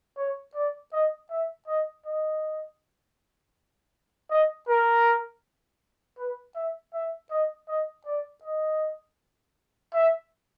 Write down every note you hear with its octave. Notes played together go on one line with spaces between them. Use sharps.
C#5
D5
D#5
E5
D#5
D#5
D#5
A#4
B4
E5
E5
D#5
D#5
D5
D#5
E5